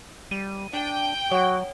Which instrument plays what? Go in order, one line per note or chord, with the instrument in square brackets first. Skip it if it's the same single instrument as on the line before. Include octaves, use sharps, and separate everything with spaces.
[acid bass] G3 [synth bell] D#7
[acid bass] D4 [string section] G5
[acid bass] F#3 [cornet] F#4 [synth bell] C#5 F#5